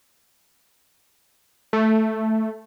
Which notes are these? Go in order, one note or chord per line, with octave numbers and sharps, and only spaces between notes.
A3